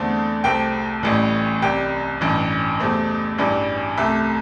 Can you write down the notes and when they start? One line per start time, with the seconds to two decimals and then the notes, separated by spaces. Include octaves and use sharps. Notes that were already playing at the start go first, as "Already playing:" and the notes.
Already playing: E2 D3 A3 C4 A5
0.44 C2 C3 A3 C4 G5
1.03 A1 A2 E3 G3
1.62 C2 C3 G3 G5
2.21 A1 G2 E3
2.80 E2 C3 A3 C4
3.38 A1 G2 E3 G3
3.97 C2 C3 A3 E5